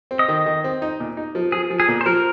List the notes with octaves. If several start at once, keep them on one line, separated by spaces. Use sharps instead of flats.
C4
D#5
D#3
D#3
C4
D#4
A#2
D#4
F3
F3 G#4
F3
G#4
A#2
C5
F3 A#4